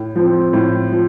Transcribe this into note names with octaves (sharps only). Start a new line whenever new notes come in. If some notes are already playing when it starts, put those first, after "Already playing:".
Already playing: A2
F3 C4
A2
F3